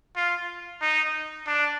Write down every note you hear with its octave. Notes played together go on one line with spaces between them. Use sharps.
F4
D#4
D4